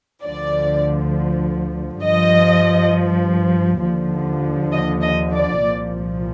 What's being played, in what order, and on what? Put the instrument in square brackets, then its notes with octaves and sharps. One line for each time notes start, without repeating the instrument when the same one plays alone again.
[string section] D2 D3 F3 D5
G2 F3 D#5
D#2 D3 F3
D#5
D#5
D5
C2 A#2 F3